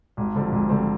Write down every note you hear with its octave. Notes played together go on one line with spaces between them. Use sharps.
G#1
G2 D3 F3 C4
G#1
G2 D3 F3 C4